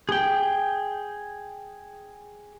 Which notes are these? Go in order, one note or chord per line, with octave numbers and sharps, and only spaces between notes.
G#4 G5